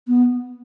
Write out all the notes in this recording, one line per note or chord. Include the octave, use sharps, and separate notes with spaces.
B3